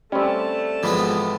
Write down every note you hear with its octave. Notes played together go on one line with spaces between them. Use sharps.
G3 A3 C4 C#4 A5
G#1 E3 F3 G#3 B3 B5